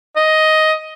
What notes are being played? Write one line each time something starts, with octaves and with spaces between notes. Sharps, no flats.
D#5